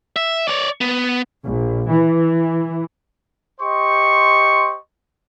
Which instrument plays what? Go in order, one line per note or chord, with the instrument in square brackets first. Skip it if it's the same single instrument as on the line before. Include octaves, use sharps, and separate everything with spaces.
[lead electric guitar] E5
C#5 D5
B3
[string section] A#1
E3
[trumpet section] G4 C5 D#5 C6 C#6